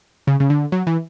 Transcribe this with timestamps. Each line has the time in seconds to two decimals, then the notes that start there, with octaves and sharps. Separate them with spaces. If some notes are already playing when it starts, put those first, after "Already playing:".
0.27 C#3
0.40 C#3
0.50 D3
0.72 F#3
0.87 E3